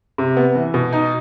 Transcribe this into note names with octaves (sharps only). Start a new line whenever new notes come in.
C3
B3
E3
B2
D#4